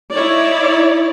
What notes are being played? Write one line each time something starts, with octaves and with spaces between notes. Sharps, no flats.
D#4 E4 C#5 D5